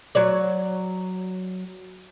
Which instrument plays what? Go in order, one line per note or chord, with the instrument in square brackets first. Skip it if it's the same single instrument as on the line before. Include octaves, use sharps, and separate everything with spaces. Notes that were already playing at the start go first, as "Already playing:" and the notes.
[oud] F#3 C#5 D5